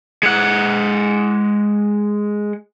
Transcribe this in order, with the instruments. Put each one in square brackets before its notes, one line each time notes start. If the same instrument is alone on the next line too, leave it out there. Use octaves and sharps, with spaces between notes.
[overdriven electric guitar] G#3 F#5